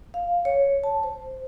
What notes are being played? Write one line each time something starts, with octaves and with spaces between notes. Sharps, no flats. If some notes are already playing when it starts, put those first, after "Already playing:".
F5
C#5
A5
C5